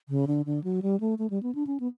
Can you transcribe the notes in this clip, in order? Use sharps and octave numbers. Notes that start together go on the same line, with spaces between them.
C#3
D3
D3
F#3
G3
A3
A3
G3
B3
D4
C#4
B3